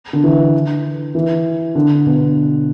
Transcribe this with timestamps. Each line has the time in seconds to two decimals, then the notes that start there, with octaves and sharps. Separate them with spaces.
0.13 D3
0.24 E3
1.15 E3
1.75 D3
2.06 B2